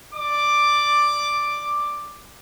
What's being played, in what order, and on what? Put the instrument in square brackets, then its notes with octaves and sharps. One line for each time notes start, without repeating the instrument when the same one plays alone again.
[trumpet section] D5 D6